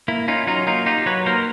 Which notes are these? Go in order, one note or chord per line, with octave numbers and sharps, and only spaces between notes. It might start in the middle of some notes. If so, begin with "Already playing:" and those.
A#3 E4
C#4 D#4 F4
F#3 D#4 F4
A#3 D#4 F4
D#4 F4 G4
F#3 B4 C#5
A#3 A#4 C5